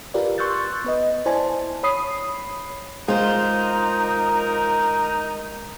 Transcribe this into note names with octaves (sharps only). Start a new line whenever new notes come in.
F4 G4 A#4 B4 D5
C6 C#6 E6 F#6 G6 A6
B3 B4 D#5
E4 C5 D5 G#5 A5
C#5 B5 D#6 C7
G#3 D#4 F4 A#4 C5